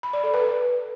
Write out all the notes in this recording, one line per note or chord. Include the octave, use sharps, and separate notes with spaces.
B5
D5
A4
B4